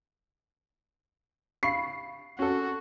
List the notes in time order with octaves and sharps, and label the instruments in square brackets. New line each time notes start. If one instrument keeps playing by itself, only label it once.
[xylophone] F5 B5 C#6 [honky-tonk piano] C7
[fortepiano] C#4 A4 [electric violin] F#4